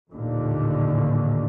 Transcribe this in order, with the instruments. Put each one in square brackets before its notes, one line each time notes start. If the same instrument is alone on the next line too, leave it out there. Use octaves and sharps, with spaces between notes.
[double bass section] A1 D#2 A#2 D3